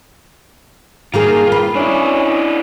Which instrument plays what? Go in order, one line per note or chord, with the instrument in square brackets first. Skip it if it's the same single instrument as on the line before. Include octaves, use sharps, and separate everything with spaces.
[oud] D#3 A#3 G#4 [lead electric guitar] F4
[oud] B4
[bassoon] C#4 [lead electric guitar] D4 E4